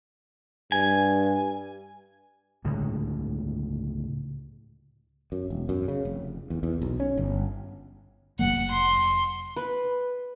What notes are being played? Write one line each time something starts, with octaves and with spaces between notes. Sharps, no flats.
G2 G#5
C#2 A2 D3 G#3
F#2
E1
F#2
C#3
F1
E2
E2
B1
C#4
G1
F1 F#3 A#3 F#5
C6
B4